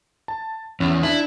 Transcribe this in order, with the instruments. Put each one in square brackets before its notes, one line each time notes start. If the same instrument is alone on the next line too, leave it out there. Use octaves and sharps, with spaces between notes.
[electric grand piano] A5
[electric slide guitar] E2 [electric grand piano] C#4
[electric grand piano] D4 [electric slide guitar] E4